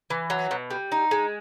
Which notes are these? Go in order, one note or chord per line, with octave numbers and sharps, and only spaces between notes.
E3
F#3
B2
G3
D#4
G#3